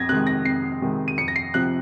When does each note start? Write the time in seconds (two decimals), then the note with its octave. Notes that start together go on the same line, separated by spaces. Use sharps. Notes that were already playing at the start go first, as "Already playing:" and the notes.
Already playing: F2 G#6 A#6
0.09 C3 D#3 G#3 F#6
0.27 A#6
0.45 F2 C7
0.82 C3 D#3 G#3
1.08 D#7
1.18 F2 C#7
1.28 A#6
1.36 C7
1.54 C3 F3 F#6